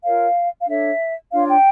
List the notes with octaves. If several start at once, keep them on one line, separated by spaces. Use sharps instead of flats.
F4 A#4 C#5 F5
F5
D4 A4 C#5 E5
D4 F4 C#5 F5
G5